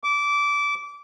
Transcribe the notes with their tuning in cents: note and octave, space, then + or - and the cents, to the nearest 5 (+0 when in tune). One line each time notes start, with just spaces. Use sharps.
D6 -20